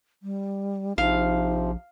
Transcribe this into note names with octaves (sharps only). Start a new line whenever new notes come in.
G3
A#1 C3 F3 D#4 F5